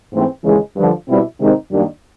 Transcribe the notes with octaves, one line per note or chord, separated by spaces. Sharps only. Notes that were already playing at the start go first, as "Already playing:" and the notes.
G#2 E3 A3 C4
D#2 C#3 E3 G#3
G2 D3 F3
B2 G3 C4 E4
C3 D#3 G#3 C4 D#4
F#2 D#3 G3 A#3 D4